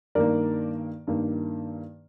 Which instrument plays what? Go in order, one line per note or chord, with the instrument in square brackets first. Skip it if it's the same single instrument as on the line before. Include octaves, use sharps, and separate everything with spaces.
[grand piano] G2 D#3 A#3 A#4 D5
G2 D#3 A#3